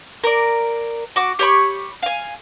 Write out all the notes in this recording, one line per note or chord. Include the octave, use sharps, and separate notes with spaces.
A#4 D5
F#4 D6
G4 C#5 B5 C#6
F5 G#5